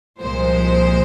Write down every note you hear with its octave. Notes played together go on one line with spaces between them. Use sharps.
C2 A#2 F3 G#3 C5